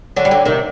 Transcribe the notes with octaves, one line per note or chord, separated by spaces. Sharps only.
D3 F#3
G3
D3 F#3
C3 D#3